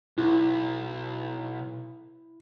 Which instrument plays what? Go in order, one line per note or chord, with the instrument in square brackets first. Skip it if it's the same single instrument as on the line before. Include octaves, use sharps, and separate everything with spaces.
[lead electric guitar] B1 [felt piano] E4